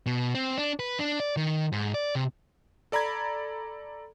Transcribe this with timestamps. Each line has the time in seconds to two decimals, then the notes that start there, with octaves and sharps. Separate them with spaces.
0.06 B2
0.35 C4
0.58 D4
0.79 B4
0.99 D4
1.20 D5
1.37 D#3
1.72 G#2
1.94 D5
2.15 C3
2.92 A4 D5 A#5 B5 G#6